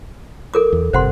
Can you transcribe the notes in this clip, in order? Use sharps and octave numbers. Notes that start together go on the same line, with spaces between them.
A4 A#4 D6
E2
G1 F2 C3 C5 F#5 C6